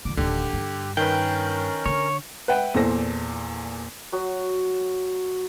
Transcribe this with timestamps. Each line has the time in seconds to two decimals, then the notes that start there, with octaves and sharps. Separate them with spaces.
0.05 F2 D3 D6
0.17 D1 D3 D#3 G4
0.53 G2
0.97 D#3 C#4 A#4 B4 G5
1.86 D3 C#5
2.48 B4 E5 F#5 G5
2.74 E2 A#2 A4 C5 A#6
4.12 F#3 F#4 D#6